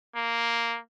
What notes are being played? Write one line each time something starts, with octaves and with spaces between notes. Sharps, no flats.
A#3